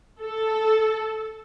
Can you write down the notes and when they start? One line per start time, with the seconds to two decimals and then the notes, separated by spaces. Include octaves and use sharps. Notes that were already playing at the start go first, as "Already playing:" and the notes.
0.20 A4